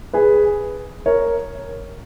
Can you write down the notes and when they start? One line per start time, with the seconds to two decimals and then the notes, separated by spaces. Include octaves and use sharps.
0.13 G#4 B4
1.06 A#4 C#5